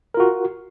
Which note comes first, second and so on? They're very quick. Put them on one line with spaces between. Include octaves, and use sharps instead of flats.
A#4 F4 F#4